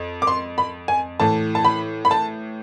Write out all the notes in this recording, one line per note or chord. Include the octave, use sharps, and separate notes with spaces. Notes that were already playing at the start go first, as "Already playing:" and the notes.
Already playing: F2
D6
C6
B5
G#5
A2 E3 A5
A5
B5
B5
A5